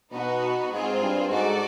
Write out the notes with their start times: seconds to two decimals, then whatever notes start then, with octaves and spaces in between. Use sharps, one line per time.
0.12 B2 B3 D#4 F#4 B4
0.71 G#2 C4 F4 G#4 C5
1.01 G2
1.30 G#2 F#4 A4 D5